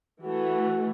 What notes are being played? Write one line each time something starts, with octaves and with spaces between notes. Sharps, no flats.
E3 A3 F#4